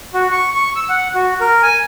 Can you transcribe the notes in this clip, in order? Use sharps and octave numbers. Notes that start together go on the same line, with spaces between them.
F#4
C#6
C#6
E6
F#5
F#4
A#4
G#5